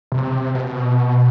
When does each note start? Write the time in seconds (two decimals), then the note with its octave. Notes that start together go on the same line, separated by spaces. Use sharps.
0.12 C3
0.55 B2